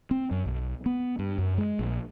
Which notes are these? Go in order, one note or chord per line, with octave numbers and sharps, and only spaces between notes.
C4
F#2
B1
B3
G2
F#2
G#3
A#1